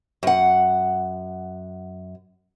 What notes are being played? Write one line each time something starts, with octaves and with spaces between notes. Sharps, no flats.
F#2 F#5